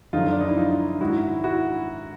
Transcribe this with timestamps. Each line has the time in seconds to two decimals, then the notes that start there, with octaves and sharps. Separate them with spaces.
0.13 F#2 D3 F3 D#4 F4
0.32 D4
0.41 D#4
0.48 E4
0.57 D#4 F4
1.01 G#2 D#3 E4 F#4
1.44 E4 F#4